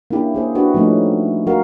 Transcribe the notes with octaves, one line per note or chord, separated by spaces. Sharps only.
A#3 C#4 D4 E4 G4
A#3 G#4 C5
D4 F#4 G4 B4
F3 G3 A3 C#4 D#4
F#3 F#4 G4 A#4 F5